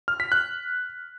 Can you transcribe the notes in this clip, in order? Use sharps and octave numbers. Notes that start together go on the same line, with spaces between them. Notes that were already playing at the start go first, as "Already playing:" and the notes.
F6
B6
F#6